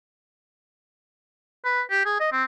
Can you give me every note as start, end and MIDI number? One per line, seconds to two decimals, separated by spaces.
1.65 1.81 71
1.90 2.03 67
2.06 2.16 68
2.20 2.28 75
2.32 2.44 60